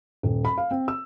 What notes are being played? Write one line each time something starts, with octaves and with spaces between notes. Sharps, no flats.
D#1
B5
F5
C4
E6